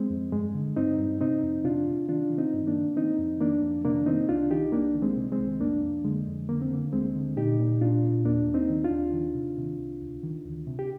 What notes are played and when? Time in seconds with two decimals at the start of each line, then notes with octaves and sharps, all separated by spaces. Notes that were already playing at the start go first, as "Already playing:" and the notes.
Already playing: G#3 C4
0.10 F2
0.32 G2 G#3
0.54 D3
0.76 G2 C4 D#4
0.98 G2
1.21 C3 C4 D#4
1.43 F2
1.64 C3 D4 F4
1.87 C3
2.09 D#3 D4 F4
2.30 D#3
2.38 C4 D#4
2.53 G2
2.67 A#3 D4
2.75 D#3
2.97 D#3 C4 D#4
3.18 F2
3.40 D#3 A#3 D4
3.62 F2
3.85 C3 A#3 D4
4.06 D#3 C4 D#4
4.29 C2 D4 F4
4.51 D#3 D#4 G4
4.72 C2 A#3 D4
4.95 D#3
5.02 G#3 C4
5.16 C3
5.32 G#3 C4
5.39 C2
5.60 F2 A#3 D4
5.83 F2
6.04 D3 G#3
6.27 F2
6.48 D3 A#3
6.62 C4
6.70 D3 A#3
6.93 D2 G#3 C4
7.15 D3
7.37 A#2 D#4 G4
7.60 A#2
7.81 A#2 D4 F4
8.03 A#2
8.25 D#2 A#3 D4
8.47 D#2
8.54 C4 D#4
8.70 D#3
8.84 D4 F4
8.91 D#2
9.13 D#3
9.35 C3
9.57 C3
9.79 C2
10.02 D2
10.23 D#3
10.46 D2
10.67 C3
10.79 G4